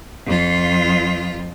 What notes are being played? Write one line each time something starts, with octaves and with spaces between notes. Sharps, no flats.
F2 F4